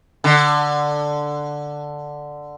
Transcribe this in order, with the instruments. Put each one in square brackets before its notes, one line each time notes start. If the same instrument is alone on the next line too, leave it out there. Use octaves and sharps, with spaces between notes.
[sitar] D3